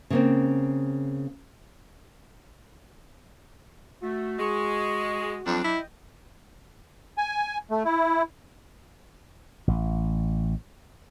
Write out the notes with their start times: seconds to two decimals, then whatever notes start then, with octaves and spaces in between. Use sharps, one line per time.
0.10 C#3 A#3 C4
4.02 A3 F#4
4.40 G#3 C#6
5.46 F2 F#3 D4
5.64 E4 D#5 G5
7.18 G#5
7.71 A3
7.85 E4
9.68 A1